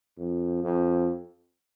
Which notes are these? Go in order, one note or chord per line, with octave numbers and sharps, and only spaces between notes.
F2
F2